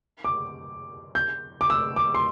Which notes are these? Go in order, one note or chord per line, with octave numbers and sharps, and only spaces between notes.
D6
G6
D6
E6
D6
C6